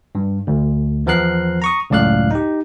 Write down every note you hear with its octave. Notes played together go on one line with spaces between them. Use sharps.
G2
D2
E2 F3 B3 A#4 F#6 C7
A#5 C#6 D#6
C#2 F#2 A2 D5 F5 F#6
D#4 G4